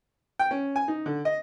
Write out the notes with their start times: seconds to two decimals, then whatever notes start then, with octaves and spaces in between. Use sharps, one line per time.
0.39 G5
0.51 C#4
0.76 G#5
0.88 D#4
1.06 D3
1.25 D#5